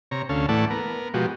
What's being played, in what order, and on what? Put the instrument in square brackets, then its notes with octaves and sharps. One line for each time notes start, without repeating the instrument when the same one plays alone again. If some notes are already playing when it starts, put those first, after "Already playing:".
[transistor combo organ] C3 C#5 A#5
D2 C#4 A4 F5
A2 E3 A3 D5 F#5 A5
B3 A#4
B2 F3 G#3 F#4 G4